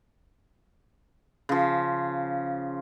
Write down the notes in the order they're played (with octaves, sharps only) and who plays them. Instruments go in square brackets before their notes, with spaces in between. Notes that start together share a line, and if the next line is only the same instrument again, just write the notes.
[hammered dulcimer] C#3 F3